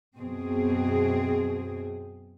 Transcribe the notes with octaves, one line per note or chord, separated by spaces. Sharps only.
F#2 B2 C4 G#4